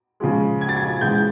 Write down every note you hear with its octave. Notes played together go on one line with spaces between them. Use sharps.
C#3 F3 G#3
G#6
A6
G#6
C#3 E3 G#3 G6